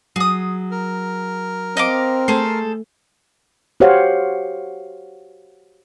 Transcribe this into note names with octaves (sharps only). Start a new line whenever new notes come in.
F#3 G#4 D#6
A#4
C4 D#5 F5 D6
A3 G#4 A4 C5
F#4 G4 C5 C#5 F5 F#5